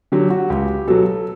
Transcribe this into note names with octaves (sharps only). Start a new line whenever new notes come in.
D3 F#3 G4
F#4
C#2 G4
B2 F#3 A4